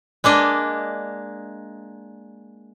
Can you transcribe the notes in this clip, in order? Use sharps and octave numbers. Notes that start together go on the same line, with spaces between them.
G#3 A#3 D4 D#5